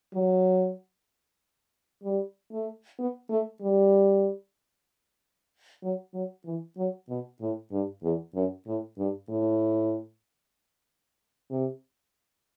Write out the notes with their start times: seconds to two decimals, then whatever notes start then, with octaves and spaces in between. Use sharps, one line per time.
0.14 F#3
2.04 G3
2.52 A3
2.99 B3
3.30 A3
3.62 G3
5.83 F#3
6.14 F#3
6.45 E3
6.77 F#3
7.09 B2
7.41 A2
7.72 G2
8.03 E2
8.35 F#2
8.67 A2
8.98 G2
9.30 A2
11.51 C3